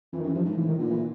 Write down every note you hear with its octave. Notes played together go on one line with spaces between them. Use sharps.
F2 E3
D#3
F#2 E3
G2 F3
G#2
A2 E3
D#3
A#2 D3
E3